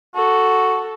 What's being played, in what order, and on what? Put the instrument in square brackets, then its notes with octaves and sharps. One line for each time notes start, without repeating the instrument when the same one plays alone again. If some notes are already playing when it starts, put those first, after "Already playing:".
[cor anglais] F#4 [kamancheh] A4